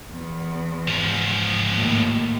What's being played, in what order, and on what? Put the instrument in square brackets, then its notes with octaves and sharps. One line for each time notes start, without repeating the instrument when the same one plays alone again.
[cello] E2
[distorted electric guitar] G#2 F3
[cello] D#2 A2